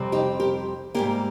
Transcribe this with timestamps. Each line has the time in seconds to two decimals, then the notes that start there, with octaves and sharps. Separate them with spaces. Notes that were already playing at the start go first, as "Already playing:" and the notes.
Already playing: F2 C3 G3 C4
0.12 D#4 G4
0.40 G4 A#4
0.94 G#2 G3 A#3 G4 A#4